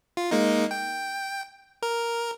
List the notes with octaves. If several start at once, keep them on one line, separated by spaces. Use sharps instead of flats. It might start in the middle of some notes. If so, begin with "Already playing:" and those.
F4
G#3 A#3 D#4
G5
A#4